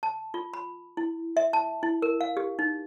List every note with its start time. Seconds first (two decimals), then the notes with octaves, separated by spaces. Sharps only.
0.03 A5
0.34 F4
0.54 B5
0.97 E4
1.37 E5
1.53 A5
1.83 E4
2.02 A#4
2.21 F5
2.37 G4
2.59 D#4